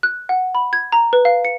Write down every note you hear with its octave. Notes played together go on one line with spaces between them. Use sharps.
F#6
F#5
B5
G#6
A#5
B4
F5
C#7